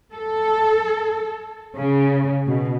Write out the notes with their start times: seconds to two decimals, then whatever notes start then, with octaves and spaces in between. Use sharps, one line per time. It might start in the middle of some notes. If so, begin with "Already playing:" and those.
0.13 A4
1.78 C#3
2.47 B2